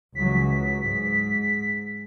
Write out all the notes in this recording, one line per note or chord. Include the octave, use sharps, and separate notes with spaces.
C#2 E3 F#3 B6
G#2